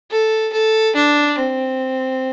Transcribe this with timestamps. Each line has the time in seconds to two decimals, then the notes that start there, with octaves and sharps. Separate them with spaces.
0.11 A4
0.53 A4
0.96 D4
1.38 C4